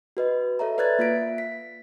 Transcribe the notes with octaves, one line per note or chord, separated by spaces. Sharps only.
F#4 B4 D#5
A4 C#5 E5 A#5
B4 D5 E5 F#6 G#6 A6
A#3 F4 E5 B6 D7
B6